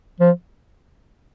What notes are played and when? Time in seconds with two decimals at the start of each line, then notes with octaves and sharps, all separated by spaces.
0.20 F3